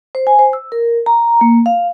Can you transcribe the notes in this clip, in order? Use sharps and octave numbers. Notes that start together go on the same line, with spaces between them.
C5
G#5
C5
E6
A#4
A#5
A#3
F5